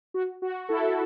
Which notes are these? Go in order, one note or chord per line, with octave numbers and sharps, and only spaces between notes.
F#4
F#4
E4 A4